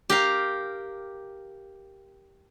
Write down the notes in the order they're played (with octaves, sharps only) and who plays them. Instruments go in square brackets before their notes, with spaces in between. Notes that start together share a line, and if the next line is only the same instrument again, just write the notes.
[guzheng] G4 A#4 F5